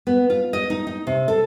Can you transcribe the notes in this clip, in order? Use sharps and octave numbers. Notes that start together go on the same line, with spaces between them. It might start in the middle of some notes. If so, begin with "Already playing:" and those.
B3
F4
D#5
D#4
D#4
C3
A4